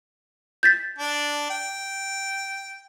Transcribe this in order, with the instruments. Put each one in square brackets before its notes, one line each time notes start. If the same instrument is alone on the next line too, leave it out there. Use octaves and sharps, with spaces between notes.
[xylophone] G6 A6 B6
[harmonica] D4
G5